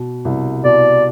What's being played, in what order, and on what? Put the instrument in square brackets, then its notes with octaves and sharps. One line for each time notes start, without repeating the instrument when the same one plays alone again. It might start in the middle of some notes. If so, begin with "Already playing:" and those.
Already playing: [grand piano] B2
C2
[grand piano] B2 [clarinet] D5